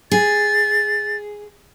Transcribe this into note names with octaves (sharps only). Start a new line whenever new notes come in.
G#4 A6